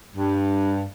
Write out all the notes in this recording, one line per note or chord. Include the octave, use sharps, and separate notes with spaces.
G2